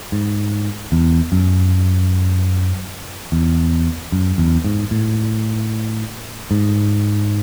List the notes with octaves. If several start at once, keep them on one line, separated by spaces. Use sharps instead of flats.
G#2
E2
F#2
E2
F#2
E2
G#2
A2
G#2